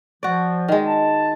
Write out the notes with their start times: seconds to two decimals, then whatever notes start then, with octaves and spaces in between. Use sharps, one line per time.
0.23 F3 F#4 D5
0.68 D#3 G#3
0.86 A5